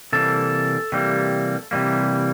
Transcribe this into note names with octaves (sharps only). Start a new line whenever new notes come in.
C3 E3 G3 A#3 A4
C3 E3 G3 A#3
C3 E3 G3 A#3